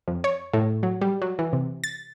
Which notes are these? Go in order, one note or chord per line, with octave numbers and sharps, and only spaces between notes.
F2
C#5
A2
F#3
G3
F#3
E3
C3
A6